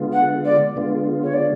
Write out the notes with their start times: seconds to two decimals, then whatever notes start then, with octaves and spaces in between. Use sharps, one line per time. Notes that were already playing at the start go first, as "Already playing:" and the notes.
Already playing: D3 G#3 B3 F4
0.13 F#5
0.45 D5
0.76 D3 G#3 B3 F4
1.23 C#5
1.33 D5